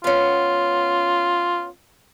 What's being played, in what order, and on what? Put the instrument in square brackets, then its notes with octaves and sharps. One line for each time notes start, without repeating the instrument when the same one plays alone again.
[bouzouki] B3 C#4 [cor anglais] F4